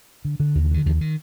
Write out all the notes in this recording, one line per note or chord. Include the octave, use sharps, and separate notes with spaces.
D3
D3
D#2
D3 D#3
D#2 F3
D#3